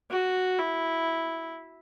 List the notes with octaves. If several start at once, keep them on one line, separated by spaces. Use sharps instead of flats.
F#4
E4